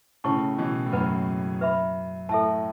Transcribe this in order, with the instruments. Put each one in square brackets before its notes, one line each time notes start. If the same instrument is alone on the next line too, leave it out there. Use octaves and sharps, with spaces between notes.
[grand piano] A2 C#3 [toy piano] E4 C#5 A5 C#6
[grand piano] B2 E3
A2
[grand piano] F#2 [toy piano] B4 F#5 B5
[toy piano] B4 E5 B5
[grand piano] A2 [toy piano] A4 E5 A5